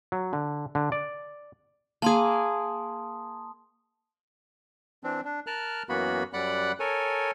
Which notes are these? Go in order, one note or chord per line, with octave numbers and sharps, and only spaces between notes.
F#3
D3
D3
D5
A#3 G#4 A5 C6 D#6
E3 C4 D4
D4
A#4 A5 F6 F#6
F#2 E3 A#3 B3 F#4 B5
F#2 G3 D5 F#5 B5 F#6
A4 A#4 C#5 G#5